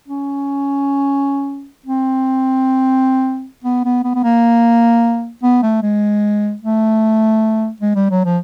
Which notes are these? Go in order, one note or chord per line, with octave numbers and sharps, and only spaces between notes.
C#4
C4
B3
B3
B3
B3
A#3
B3
A3
G#3
A3
G#3
G3
F#3
F3